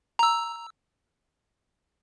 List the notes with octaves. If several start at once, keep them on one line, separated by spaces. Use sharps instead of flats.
A#5 E6